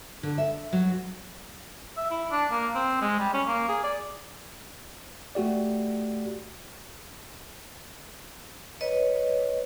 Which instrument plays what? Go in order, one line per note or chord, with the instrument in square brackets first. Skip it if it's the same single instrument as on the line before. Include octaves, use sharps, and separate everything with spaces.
[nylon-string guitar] D3
E5
F#3
[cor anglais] E5
E4
D4
A#3
C4
G#3
G3
C#4
A#3
G#4
D5
[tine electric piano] A3 F#4 G4 D5
[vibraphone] B4 C#5 D#5